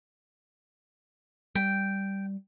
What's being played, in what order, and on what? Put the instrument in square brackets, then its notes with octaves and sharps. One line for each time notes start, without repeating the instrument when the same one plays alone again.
[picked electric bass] G3 [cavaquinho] G5